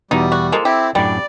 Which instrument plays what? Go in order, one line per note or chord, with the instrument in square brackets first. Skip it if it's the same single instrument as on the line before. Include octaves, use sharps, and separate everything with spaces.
[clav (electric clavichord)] E2 B2 B3 [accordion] G3 [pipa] D#4
[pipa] F#4
[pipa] F3 G#3 A#3 [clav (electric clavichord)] A4
[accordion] C4 E4 [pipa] G4
[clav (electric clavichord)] F#2 A2 D4 [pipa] G3 [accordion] D5